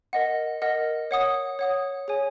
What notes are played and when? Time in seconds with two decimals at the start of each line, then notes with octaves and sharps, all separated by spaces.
0.13 A#4 D#5 F#5
0.62 A#4 D#5 F#5
1.11 C#5 F#5 D#6
1.59 C#5 F#5 D#6
2.08 G#4 C#5 G#5